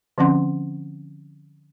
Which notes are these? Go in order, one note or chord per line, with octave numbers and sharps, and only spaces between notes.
D3 F3 C4 C#4 F#5 C6